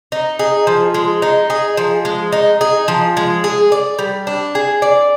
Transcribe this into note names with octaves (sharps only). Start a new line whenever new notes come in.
D#4
G#4
F3
G#3
D#4
G#4
F3
G#3
D#4
G#4
F3
G#3
G#4
D5
G3
D4
G#4
D5